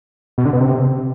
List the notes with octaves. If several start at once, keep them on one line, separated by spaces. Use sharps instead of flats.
B2
D3
B2
C3